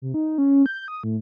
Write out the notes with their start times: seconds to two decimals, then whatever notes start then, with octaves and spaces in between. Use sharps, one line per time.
0.02 C3
0.14 D#4
0.38 C#4
0.66 G6
0.88 D#6
1.03 A2